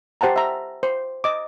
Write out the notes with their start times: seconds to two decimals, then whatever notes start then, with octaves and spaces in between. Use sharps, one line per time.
0.21 G4 C5 F#5 A5 A#5
0.36 E5 A#5
0.83 C5
1.24 D#5 D6